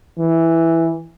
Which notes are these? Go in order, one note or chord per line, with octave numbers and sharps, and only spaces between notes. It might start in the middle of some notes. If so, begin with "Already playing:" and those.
E3